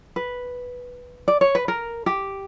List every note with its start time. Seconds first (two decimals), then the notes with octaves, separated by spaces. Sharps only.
0.16 B4
1.28 D5
1.41 C#5
1.55 B4
1.68 A#4
2.06 G4